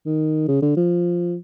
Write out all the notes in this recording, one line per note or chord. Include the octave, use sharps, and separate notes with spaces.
D#3
C#3
D3
F3